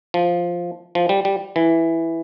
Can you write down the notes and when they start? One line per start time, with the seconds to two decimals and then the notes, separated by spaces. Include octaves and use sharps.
0.14 F3
0.95 F3
1.09 G3
1.25 G3
1.56 E3